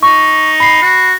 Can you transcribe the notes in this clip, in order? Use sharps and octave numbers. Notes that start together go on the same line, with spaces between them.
D#4 C#6
B5 C7
F#4